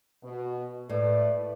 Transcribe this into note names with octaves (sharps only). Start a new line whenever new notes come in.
B2
A2 A3 B4 D5